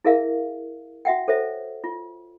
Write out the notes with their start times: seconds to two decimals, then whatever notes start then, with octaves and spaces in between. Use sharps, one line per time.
0.04 E4 G#4 A#4 E5 F5
1.05 F#4 E5 F#5 G5
1.28 A4 C5 C#5 E5
1.84 F4